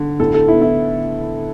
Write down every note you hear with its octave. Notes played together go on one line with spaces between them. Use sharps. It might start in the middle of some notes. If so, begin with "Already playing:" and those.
Already playing: D3
A2 A4
A4
B3 E4
E4